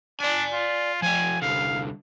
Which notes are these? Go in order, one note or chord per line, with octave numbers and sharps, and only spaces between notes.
D4 D5 G#5
F4
F3 G4 G#5
C2 D3 F5